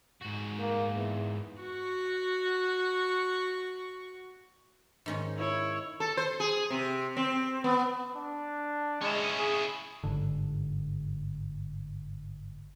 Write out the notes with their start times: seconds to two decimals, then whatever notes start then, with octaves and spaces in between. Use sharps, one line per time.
0.22 G#2 F#4
0.59 A#3
0.95 E2
1.62 F#4 C#6
5.06 G#2 D#3 C#4
5.37 E4 C#5
6.00 A4
6.17 C5
6.40 G#4
6.70 C3
7.16 C4
7.64 B3
8.15 D4
9.01 G#3 C#4 E4
9.39 G#4
10.03 G1 G#2 D3